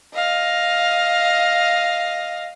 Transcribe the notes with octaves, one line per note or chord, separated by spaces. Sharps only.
D#5 F5